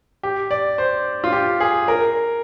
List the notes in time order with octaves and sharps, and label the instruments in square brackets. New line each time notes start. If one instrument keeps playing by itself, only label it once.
[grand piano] G4
D5
C5
F4
G4
G#4
A#4